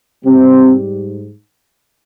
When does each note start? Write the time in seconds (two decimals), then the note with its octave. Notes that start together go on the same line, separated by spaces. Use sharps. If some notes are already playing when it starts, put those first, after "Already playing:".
0.24 G#2 C3 G3 C4